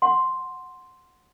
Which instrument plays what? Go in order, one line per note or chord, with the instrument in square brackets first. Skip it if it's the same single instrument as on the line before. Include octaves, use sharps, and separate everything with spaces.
[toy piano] F#5 C6